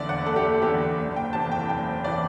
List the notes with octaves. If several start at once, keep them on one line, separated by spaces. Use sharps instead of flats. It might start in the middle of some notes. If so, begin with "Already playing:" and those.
Already playing: F#1 E2 D3 D5 E5
F#5
F#1 A4
G4
A4
E2 D3 G4
F#1
G5
E2 C3 E3 A5
G5
F#1 G5
C3 E3 D5